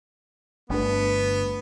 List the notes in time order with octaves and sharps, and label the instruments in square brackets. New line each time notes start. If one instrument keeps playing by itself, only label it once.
[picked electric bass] G1 [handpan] A3 D4 B4 [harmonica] B3